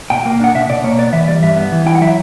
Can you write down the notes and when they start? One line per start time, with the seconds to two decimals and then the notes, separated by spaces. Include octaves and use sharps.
0.10 B2 G5
0.25 A#3
0.40 D4 F#5
0.55 B2 E5
0.70 B2 D5
0.84 A#3 C#5
0.98 B3 D5
1.13 E3 E5
1.28 G3 D5
1.42 G2 E5
1.56 B3
1.72 E3
1.86 E4 G5
1.95 F#5
2.01 F#3 E5